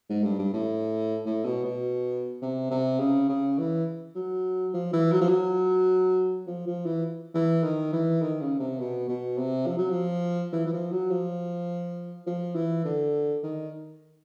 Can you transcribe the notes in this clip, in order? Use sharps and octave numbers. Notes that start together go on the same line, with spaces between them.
G#2
G2
G2
A2
A2
B2
B2
C3
C3
C#3
C#3
E3
F#3
F3
E3
F#3
F3
F#3
F3
F3
E3
E3
D#3
E3
D#3
C#3
C3
B2
B2
C3
F3
F#3
F3
E3
E3
F3
F#3
F3
F3
E3
D3
D#3